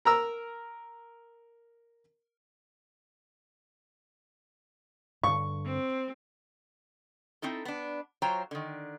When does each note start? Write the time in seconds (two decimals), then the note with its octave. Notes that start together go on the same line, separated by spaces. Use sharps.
0.05 A#4 A#5 E6
5.24 G2 D3 C#6
5.65 C4
7.42 C4 D#4 E4 A4
7.65 B3 D4
8.22 F#3 F4 C5 C#5 G5 A#5
8.51 D3 D#3